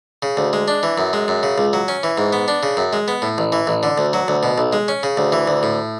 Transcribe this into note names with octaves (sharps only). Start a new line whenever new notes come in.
C#3
D2
G#3
D4
E3
F#2
G#3
F#2
C#3
C#2
F#3
C#4
E3
G#2
B3
D4
C#3
F#2
G#3
B3
A2
A1
E3
A1
D3
D2
F#3
D2
B2
B1
G#3
C#4
C#3
D2
E3
D2
A2